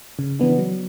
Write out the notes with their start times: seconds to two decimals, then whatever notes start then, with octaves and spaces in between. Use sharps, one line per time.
0.19 C#3
0.39 E3 B3 D4
0.59 F#3